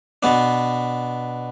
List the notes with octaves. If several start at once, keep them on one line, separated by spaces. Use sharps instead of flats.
B2 B3 D4